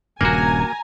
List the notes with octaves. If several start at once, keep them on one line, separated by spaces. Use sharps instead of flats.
D#1 G2 C#3 A#3 F#4 G#5 A#5